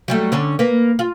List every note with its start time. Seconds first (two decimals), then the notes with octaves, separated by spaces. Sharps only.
0.08 F#3 G3 A3
0.32 D3 C#4 D4
0.59 A#3 B4
0.99 F4